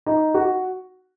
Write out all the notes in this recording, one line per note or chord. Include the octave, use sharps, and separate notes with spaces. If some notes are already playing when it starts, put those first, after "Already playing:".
D#4
F#4